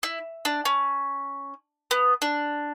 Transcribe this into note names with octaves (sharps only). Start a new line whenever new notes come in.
E4
D4
C#4
B3
D4